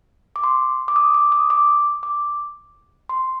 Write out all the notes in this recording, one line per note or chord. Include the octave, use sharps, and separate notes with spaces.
D6
C6
D6
D#6
D6
D#6
D6
D6
C6